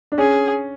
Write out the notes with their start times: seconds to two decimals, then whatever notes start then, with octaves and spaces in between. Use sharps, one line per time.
0.12 D4
0.18 C#4 G#4